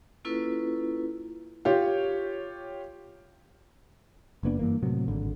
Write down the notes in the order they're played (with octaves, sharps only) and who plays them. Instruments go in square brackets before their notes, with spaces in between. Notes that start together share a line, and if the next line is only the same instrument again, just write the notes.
[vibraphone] A#3 C#4 E4 F4 A4 B4
[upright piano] F4 G4 C#5
[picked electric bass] F#1 A#3 B3 D4
G2 E3 A#3
A2 C3 F#3
G#1 D3